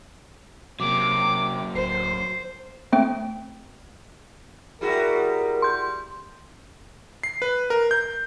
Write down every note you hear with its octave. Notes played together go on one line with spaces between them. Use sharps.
C3 F#3 A#3 D6
D1 C5 C7
A3 C4 G5
G3 E4 F#4 G#4 A#4
C6 G6
C7
B4
A#4
G6